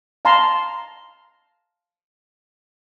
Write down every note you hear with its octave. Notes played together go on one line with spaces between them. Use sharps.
F5 A5 A#5 C6